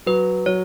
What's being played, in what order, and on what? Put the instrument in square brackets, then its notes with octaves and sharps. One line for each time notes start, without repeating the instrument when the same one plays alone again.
[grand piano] F#3 [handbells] B4
[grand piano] F#3 [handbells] C#5